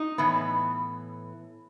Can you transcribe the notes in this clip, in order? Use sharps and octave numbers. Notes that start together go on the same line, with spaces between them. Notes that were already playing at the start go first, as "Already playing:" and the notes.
Already playing: D#4
A2 E3 B3